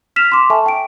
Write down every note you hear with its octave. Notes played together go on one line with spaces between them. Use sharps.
F6 B6 E7 F7
C6 D6
A4 E5 G#5 A5 C#6
G5 D7